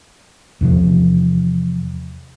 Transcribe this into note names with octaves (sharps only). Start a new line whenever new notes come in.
E2 C3 F3